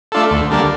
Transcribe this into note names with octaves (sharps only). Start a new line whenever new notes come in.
A3 D4 F4 A4
D2
D3 G3 A#3 D4